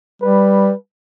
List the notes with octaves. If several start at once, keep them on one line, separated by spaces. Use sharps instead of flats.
G3 B4